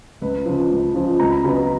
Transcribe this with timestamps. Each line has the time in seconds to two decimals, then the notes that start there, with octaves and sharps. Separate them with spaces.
0.22 C#2 B4
0.46 C#3 F3
0.71 C#2
0.94 C#3 F3
1.19 C#2 A#5
1.32 B5
1.44 C#3 F#3 B3 B5